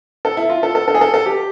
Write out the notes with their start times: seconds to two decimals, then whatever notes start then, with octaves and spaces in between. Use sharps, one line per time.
0.25 A4
0.37 E4
0.49 F4
0.63 A4
0.75 A4
0.88 A4
0.94 G#4
1.01 A4
1.14 A4
1.26 G4